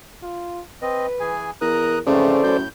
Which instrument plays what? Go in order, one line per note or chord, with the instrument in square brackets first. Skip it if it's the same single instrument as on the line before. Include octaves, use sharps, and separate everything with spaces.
[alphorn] F4
[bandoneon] C4 D#5 [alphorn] B4
[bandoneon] E3 G#4 G#5
[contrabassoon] E2 [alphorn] A#4 [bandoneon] A#5 D#6 F#6
[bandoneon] F2 G#2 A3 [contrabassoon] C#3 [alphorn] E3 [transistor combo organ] A4 C5 D5
[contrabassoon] F#2 [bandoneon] A2 G6